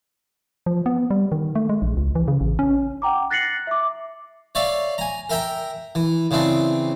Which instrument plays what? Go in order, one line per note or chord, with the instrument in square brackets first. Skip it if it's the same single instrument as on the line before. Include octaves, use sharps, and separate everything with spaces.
[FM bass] F3
B3
G3
D#3
A3
G#3
A#1
C#2
E3
C#3
A1
C#4
[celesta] F#5 G5 A#5 D6
F#6 A6 A#6 C7 C#7 F#7
E5 D6
[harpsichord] C#5 D5 E5 F5
G#5 A#5
A#4 E5 G5 A#5
E3
C#3 E3 C4 D4